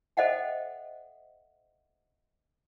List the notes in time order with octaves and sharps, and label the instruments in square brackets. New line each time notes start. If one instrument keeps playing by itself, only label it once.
[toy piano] A4 C5 D#5 E5 F#5 G5